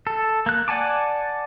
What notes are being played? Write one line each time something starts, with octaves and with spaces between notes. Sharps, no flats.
A4
A#3 F#6
D5 F#5 G#5 A5 D6